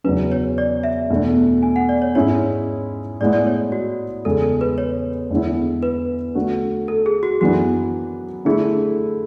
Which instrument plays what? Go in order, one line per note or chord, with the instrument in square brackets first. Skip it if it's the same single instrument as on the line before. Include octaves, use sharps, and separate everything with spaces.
[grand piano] E2 C#3 F#3 C#4 [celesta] B4
[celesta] C#5
D5
E5
[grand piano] E2 B2 A3 D4
[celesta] G#5
F#5
D5
C#5
[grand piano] G#2 G#3 C#4 E4 [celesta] C#5
[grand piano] A2 G#3 B3 E4 [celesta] D5
[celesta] D5
C#5
F#4
[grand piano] E2 C#3 G#3 [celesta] A4
[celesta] A4
B4
C#5
[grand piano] E2 D3 G#3 B3 E4
[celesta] B4
[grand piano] D3 A3 D4 F#4
[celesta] A4
G#4
F#4
[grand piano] F#2 E3 B3 D4 [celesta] F#4
[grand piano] D3 A3 E4 [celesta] G#4